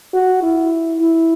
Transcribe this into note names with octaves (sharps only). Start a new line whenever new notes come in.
F#4
E4
E4